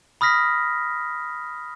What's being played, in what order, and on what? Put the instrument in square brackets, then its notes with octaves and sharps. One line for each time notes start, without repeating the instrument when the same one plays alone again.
[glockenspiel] B5 D#6 F6 A#6 B6